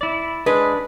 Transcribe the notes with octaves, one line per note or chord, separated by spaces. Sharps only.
E4 D5
G#3 D4 B4